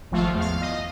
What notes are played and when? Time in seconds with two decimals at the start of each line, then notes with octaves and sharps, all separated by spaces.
0.11 G#1 F3 A3 F4
0.35 E2 F5
0.62 D#5